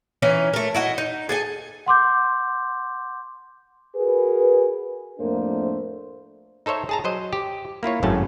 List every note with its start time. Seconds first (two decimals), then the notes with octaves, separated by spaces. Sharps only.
0.22 E3 C#4 D#4 E4
0.53 A3 A#4
0.75 E4 F#4 D#5
0.98 D#4
1.29 G#4 A4 G#5
1.86 F#5 C6 D6 G6
3.96 F#4 G#4 A#4 B4
5.19 F2 A2 A3 A#3 D4 C5
6.66 D#4 A4 C5 C#5 E5
6.89 G#4 A5 A#5
7.04 F#3 C5 D#5
7.33 G4
7.83 A#3 E4 F4 C#5
8.03 G#1 F#2 A2 A3 C#4 A5